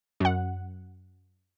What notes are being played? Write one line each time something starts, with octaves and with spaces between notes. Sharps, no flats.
F#2 F#5